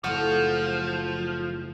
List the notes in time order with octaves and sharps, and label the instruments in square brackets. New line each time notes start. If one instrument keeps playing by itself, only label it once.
[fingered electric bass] F#1 A2 [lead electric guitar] F3 [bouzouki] F#4 A4